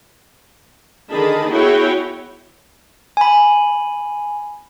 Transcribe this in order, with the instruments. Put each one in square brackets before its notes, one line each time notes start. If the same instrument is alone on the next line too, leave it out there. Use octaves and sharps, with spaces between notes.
[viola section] D3 D#3 D#4 G#4 A5 B5
B3 E4 F#4 G#4 C#5 G5
[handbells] G#5 B5